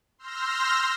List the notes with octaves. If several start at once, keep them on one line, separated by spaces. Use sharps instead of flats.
C6 E6 F6 G6 A#6